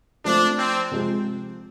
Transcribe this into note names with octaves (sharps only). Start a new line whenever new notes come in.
F3 A3 C4 D4
C4
C3 F3 G#3